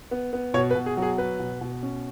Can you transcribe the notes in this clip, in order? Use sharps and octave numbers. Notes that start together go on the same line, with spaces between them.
B3
B3
B2 C#5
B4
B2
G#4
F#3
G#4
B3 B4
B2
B2
C#4